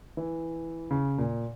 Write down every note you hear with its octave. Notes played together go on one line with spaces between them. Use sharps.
E3
C#3
A#2